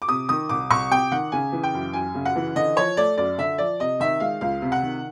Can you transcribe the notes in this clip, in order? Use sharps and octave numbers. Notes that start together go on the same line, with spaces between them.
D6
C3 D#6
D#3 D#6
C2 D6
C2 C#6
C3 G5
D#3 F#5
C#3 G#5
E3
G5
F#2
F#2 G#5
C#3
F#5
E3
D3 D#5
F3 C#5
A3 D5
F#2 D5
D3 E5
F3 D5
C3 D#5
D#3 E5
G#3 F5
C#2 F5
C3
F#5
D#3